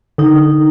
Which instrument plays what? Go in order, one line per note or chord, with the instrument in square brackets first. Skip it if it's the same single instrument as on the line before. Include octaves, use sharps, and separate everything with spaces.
[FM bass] D3 [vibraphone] D#4